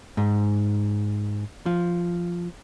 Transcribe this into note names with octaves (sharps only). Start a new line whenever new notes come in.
G#2
F3